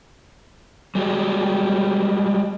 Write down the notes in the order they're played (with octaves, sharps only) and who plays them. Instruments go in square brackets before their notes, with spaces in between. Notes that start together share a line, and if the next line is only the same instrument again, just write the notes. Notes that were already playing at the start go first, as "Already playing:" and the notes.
[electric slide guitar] G3 G#3 F#4 G4